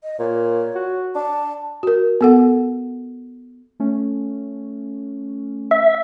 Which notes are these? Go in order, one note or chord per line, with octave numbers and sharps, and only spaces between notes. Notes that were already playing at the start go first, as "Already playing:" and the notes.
D#5
A#2 C#5
F#4
D4 A5
F#4 A#4
B3 A4 F#5
A3 C#4
E5